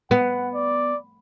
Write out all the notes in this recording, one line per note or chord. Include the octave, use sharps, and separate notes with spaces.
B3 F#5
D5